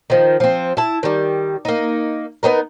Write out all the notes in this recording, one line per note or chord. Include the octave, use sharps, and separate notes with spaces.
D#3 F3
F3 C4
E4 A5
D#3 G3
A#3 D#4
B3 C#4 D#4 A#4